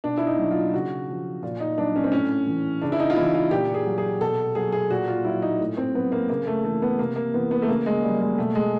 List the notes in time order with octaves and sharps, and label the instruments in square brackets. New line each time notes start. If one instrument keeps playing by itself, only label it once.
[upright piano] B2 D4
E4
D#4
F#3
F4
C#3 F#4
F3
A#2 F4
D#4
F#3 D4
C#4
C4
A2 C#4
E3
C#3 D4
E4
D#4
F4
E3 E4
F4
A#2 G4
G#4
F#3
G#4
B2 A4
F#3 G#4
G#4
A#2 F#4
F4
F#3 E4
D#4
A2
C4
F#3 B3
A#3
C#3 A#3
A3
E3 A3
B3
C3 A#3
A#3
E3 B3
B3
A3
C#3 A#3
G#3
F#3 G3
G#3
B2 A3
G#3